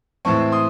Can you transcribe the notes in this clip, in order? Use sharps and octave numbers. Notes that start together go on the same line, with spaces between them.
A2 E3 G#3 C4 A5 C#6
C6 D#6